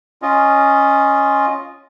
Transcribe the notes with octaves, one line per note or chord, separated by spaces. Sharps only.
C#4 F4 D#5